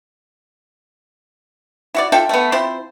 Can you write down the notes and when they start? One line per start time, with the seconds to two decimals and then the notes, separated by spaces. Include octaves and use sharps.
1.95 E4 F#4 D5
2.12 F4 A4 E5 G5
2.29 A3 B3
2.52 F3 C4 E4 C5